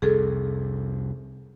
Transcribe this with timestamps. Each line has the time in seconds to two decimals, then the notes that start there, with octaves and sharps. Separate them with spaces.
0.02 C2 F2 C3 G#4 A4